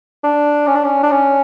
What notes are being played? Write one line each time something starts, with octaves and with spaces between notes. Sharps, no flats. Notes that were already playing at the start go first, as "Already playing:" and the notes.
D4
C#4
D4
C#4
D4
C#4